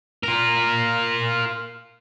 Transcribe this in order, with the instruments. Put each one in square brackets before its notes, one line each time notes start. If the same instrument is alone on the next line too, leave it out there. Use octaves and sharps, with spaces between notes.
[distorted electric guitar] F4 A#4